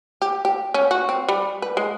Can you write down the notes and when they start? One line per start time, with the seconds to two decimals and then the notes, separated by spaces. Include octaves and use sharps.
0.22 G4
0.45 G4
0.74 C#4
0.91 F#4
1.09 C4
1.29 G3
1.62 B4
1.77 G#3